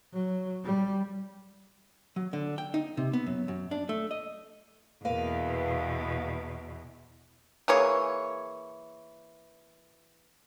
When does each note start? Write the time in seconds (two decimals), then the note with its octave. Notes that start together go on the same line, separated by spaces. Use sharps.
0.13 F#3
0.64 G3
2.16 F#3
2.33 D3
2.58 G5
2.74 D#4
2.97 C3
3.13 B3
3.27 F#2
3.48 F#2
3.71 D4
3.89 A3
4.11 D#5
5.05 E2 B2 A#3 B4 F5
7.68 E3 A#3 G#4 C#5